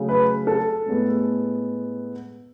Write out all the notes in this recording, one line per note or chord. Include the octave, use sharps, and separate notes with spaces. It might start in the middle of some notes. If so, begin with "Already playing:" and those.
Already playing: C#3 F#3 A3
B4
A4
A2 G#3 B3